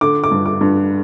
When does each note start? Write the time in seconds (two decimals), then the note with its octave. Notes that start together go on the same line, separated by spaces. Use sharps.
0.01 D3 D6
0.24 D6
0.31 G2
0.46 D6
0.61 G2